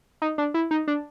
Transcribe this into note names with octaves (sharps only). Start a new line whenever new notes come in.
D#4
D4
E4
D#4
D4